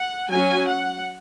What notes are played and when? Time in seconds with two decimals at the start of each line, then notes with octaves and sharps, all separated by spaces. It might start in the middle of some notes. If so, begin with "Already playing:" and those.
Already playing: F#5
0.30 F#3 C#4 G#5
0.66 F#5